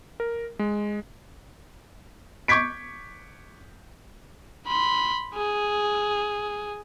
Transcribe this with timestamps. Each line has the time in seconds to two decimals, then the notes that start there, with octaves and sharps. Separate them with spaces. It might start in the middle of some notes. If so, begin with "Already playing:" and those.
0.20 A#4
0.59 G#3
2.48 C#6 D6 G6 G#6 B6 D7
4.67 B5 C6
5.35 G#4